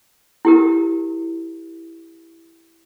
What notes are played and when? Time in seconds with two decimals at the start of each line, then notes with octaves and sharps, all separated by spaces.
0.45 E4 G4 A#4